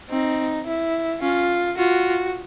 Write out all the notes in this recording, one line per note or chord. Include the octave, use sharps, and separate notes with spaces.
C4 D#4
E4
C#4 F4
F4 F#4